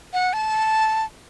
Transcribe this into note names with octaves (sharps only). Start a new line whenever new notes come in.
F#5
A5